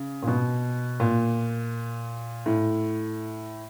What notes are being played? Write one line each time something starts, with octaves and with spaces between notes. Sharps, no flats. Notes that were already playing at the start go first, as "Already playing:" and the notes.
Already playing: C#3
A#2
B2
A#2
A2